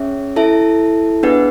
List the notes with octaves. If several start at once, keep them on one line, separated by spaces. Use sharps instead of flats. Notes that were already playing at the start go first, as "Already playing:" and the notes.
Already playing: C#4 G#4 C#5 E5
E4 A4 E5 A5
B3 D4 G#4 B4 F#5